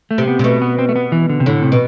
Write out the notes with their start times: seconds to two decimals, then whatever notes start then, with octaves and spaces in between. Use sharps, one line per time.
0.11 A3
0.18 C3
0.28 B3
0.39 C3
0.44 B2 A3
0.62 B3
0.79 C4
0.89 A3
0.96 B3
1.12 E3
1.29 D3
1.40 C3
1.46 A2 D3
1.63 C3
1.72 B2